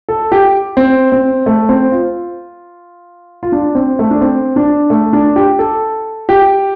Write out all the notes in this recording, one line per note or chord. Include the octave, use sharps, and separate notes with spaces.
A4
G4
C4
C4
A3
C4
F4
F4
D4
C4
A3
D4
C4
D4
A3
D4
G4
A4
G4